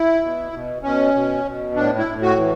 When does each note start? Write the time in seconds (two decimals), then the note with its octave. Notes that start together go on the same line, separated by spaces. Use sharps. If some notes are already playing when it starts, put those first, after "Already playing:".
Already playing: E4
0.22 B2
0.52 B2
0.82 B2 C#4
1.14 B2
1.45 B2
1.75 A2 D4
1.98 E4
2.06 A2
2.22 F#4
2.36 E3